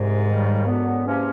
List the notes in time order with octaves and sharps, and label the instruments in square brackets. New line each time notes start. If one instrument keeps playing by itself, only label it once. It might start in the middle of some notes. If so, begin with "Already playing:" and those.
Already playing: [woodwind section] C2 C3 [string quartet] G#2
[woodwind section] D#2 D#3 G3
F#2 D3 F#3 B3
E2 C3 F3 A#3 C#4